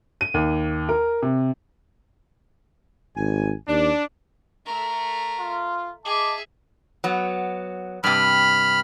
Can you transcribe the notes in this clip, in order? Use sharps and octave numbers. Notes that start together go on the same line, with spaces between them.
D#7
D#2
A#4
C3
G#1 G#5
D#2 D4
A3 A#4
F4
G#4 D#5 E5 A5 D6
F#3 B3
G2 C3 B5 F6